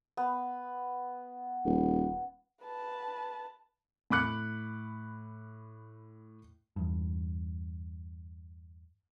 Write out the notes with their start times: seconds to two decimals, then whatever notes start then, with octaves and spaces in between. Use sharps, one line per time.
0.17 B3
1.65 D#1
2.64 B4 A5
4.10 A2 B5 D6 F#6 C#7
6.76 E2 G2